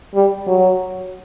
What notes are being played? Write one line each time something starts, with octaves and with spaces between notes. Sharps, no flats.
G3
F#3